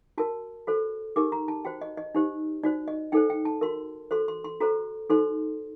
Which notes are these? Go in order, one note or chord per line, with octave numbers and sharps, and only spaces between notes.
F#4 A#4 A5
F#4 A4 C5
D#4 G4 A#4 D6
A#5
A5
F#4 C5 G5
D#5
D#5
D#4 G4 C5
D#4 F#4 C5 D5
D#5
D#4 A4 C5 G5
G5
A5
F#4 A#4 C6
F#4 A4 C5 C6
C6
C6
F#4 A4 C5 A#5
D#4 F#4 A4 C5 C6